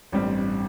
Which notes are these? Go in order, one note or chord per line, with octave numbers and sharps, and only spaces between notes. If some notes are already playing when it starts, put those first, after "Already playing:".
A1 G2 G3 C4